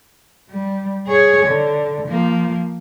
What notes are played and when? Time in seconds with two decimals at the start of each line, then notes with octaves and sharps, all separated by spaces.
0.50 G3
1.07 G#4 C#5
1.46 D3
2.08 F3 A#3